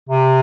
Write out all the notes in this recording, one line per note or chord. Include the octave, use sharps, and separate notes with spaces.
C3